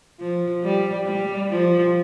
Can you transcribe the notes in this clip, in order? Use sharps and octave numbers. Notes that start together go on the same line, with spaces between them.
F3
G3
G3
F3